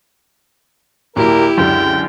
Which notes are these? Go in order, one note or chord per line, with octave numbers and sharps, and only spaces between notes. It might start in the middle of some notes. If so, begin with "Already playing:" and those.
D#2 A#2 F#3 E4 G4 A#4
C#2 F#2 D3 G5